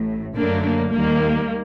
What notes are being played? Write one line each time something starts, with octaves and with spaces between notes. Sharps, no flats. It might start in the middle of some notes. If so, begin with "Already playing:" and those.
Already playing: A1 A2
F#2 D3 F#3 A3 A#3 D4
A#3
D#2 D#3 G3 A#3